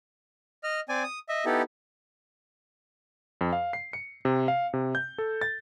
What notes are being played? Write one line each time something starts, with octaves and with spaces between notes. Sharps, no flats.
D#5 F6
C4 D5 G#5
D#6
D#5 E5
B3 D#4 E4 G4 A4
F2
F5
C7
C#7
C3
F5
C3
G6
A4
A6